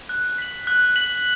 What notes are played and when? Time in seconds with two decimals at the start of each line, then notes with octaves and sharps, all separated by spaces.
0.09 F#6
0.38 B6 F#7
0.67 F#6
0.96 B6 F#7